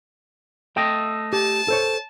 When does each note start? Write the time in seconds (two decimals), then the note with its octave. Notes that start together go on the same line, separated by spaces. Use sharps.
0.77 A3 A4 D#5 G5
1.33 G4 A5
1.68 A4 C5 C#5